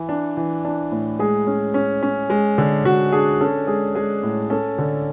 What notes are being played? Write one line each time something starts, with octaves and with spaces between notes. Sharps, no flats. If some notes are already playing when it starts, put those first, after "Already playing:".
Already playing: E3
D4
E3
D4
A2
G#3 G#4
C#4
C#4
C#4
G#3
D3
D3 F#4
D4 G#4
C#4 A4
G#3 G#4
G#3 G#4
A2
C#4 A4
D3